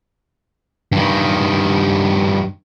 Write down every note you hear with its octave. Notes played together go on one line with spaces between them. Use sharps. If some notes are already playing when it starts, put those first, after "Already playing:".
G2 D#3